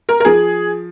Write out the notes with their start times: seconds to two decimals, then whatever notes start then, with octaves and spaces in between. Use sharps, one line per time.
0.09 A#4
0.20 A#4
0.25 F3 G#4